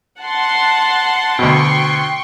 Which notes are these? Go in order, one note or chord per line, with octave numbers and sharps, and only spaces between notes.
F#5 A5 C6
D2 B2 G5 C6 C#6